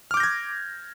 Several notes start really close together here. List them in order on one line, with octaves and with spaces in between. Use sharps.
F6 D6 G6 A#6 G#6